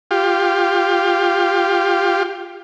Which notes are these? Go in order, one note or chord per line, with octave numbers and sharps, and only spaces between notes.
F4 G4